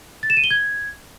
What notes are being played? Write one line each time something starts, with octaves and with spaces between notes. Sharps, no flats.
A6
E7
D#7
G7
G#6